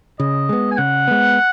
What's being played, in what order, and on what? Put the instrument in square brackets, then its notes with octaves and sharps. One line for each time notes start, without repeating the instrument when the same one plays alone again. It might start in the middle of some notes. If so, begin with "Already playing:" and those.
[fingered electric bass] C#3 [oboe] D#5
[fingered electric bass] G#3 B3
[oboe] G#5
[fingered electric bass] C#3 [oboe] F#5
[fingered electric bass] G#3 B3